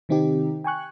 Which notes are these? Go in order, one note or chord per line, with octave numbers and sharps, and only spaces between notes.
C3 D#3 C4 D#4 G4
G5 G#5 C#6 F#6